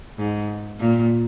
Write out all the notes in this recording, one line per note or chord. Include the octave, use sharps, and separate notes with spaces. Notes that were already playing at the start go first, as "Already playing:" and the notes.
G#2
A#2